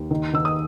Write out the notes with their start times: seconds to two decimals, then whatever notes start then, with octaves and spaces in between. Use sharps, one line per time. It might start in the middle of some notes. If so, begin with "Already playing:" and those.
Already playing: D#2
0.11 D#3
0.34 D#3 E6
0.45 D#6